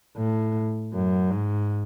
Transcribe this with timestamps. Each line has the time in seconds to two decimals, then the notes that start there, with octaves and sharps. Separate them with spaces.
0.17 A2
0.93 F#2
1.31 G#2